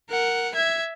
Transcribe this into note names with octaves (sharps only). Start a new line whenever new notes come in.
A#4 F#5
E5 G#6